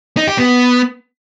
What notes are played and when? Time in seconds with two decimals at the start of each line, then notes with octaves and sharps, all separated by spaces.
0.17 D#4
0.28 G4
0.38 B3